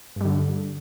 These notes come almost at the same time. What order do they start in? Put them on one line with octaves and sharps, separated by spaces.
G2 G3 D3